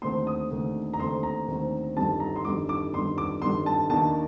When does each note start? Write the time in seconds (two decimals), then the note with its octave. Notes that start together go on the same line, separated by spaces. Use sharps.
0.02 D#2 D3 A3 C4 C6
0.27 D#6
0.50 D#2 D3 A3 C4
0.93 A#5
0.99 D#2 D3 A3 C4 C6
1.23 A#5
1.48 D#2 D3 A3 C4
1.96 G1 F2 D#3 G3 D4 A5
2.20 A#5
2.36 C6
2.45 G1 F2 D#3 G3 D4 D6
2.69 D6
2.94 G1 F2 D#3 G3 D4 C6
3.18 D6
3.42 G1 F2 D#3 G3 D4 C6
3.66 A5
3.90 D#2 D#3 A#3 D4 A5